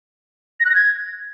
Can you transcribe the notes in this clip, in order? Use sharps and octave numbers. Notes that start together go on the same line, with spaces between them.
A#6
F#6
A#6
G#6